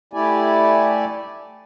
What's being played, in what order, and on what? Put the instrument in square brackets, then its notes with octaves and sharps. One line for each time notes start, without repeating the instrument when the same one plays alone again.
[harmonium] A3 E4 G4 D5 G#5